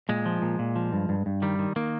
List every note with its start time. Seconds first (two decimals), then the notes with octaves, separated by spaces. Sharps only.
0.09 A#2 G#3
0.26 F3
0.42 A#2
0.59 A#2
0.76 F3
0.93 G2
1.09 G2
1.26 G2
1.42 D#3 G3
1.59 D#3
1.76 D#3 A#3